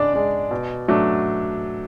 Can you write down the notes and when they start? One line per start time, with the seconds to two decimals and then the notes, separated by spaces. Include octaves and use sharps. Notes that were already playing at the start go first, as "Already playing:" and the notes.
Already playing: C#3 G#3 D4 D5
0.14 G#3 D4
0.51 B2
0.88 F#3 A3 D4